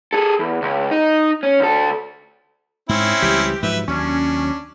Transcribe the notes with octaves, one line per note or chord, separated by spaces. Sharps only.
G#4 A4
E2
C#2
D#4
C#4
D2 A4
G#2 C4 C#4 E4
C#2 E3 G3 G4
G#2 F3 F#3 B4 E5
D#2 F#3 C#4 D4